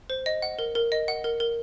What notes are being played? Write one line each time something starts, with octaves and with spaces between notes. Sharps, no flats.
C5
D#5
F#5
A#4
A#4
D#5
F#5
A#4
A#4